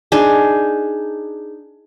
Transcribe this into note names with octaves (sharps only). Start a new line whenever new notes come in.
D4 D#4 G#4